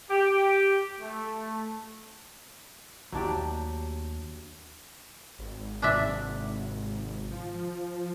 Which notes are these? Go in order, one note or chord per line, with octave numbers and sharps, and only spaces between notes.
G4
A3
D#2 F#3 A3 D4 G4
G#1
G#2 C3 D#3 D4 D5 E5
F3